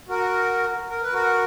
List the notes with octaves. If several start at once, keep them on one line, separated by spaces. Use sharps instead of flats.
F#4 A#4
A#4
B4
F#4 A#4